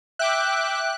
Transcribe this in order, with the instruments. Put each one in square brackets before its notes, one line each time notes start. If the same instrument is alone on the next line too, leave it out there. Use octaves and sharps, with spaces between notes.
[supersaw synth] E5 G5 D6 [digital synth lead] F#6